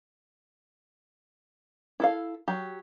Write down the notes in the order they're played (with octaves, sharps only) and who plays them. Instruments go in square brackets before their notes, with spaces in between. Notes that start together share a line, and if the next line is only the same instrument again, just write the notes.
[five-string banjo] E4 A4 F5
F#3 G4